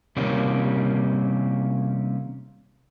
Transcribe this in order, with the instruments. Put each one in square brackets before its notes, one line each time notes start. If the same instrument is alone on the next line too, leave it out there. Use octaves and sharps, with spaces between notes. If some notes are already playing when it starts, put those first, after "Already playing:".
[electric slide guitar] C3 D#3 G3 A#3 C#4